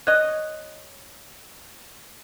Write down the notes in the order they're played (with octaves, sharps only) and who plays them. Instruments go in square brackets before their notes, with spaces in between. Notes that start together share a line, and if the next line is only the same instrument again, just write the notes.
[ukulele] C#5 D#5 [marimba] F#6